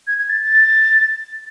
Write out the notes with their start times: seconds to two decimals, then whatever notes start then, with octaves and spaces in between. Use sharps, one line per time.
0.07 G#6
0.18 G#6
0.29 A6
0.41 A6